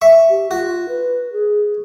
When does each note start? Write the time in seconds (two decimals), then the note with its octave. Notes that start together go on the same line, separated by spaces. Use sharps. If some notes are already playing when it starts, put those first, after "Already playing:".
0.02 E5 C#6
0.30 G4
0.51 F4 F#4
0.89 B4
1.33 G#4